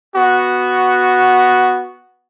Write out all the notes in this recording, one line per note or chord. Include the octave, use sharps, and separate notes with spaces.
B3 F#4